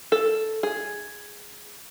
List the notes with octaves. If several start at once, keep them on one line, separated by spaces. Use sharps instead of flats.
A4
G#4